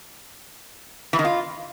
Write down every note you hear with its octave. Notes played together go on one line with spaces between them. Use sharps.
E3
D#3
F4